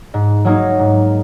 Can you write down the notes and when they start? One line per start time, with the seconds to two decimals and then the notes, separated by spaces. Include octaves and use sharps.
0.14 G#2
0.45 F#3 A#3 D#4 G#4
0.79 G#2